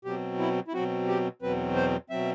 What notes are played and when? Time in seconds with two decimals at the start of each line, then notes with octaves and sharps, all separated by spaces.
0.05 B2 F#3 C4 G4
0.39 E4
0.68 E4
0.73 B2 F#3 C4 F#4
1.08 G4
1.42 E2 B2 F#3 C4 B4
1.76 C5
2.10 B2 F#3 C4 E5